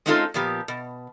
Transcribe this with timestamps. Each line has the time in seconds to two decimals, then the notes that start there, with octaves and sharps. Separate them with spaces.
0.06 G#3 C4 C#4 D#4 F4 A4
0.34 A#2 F3 B3 G4
0.68 B2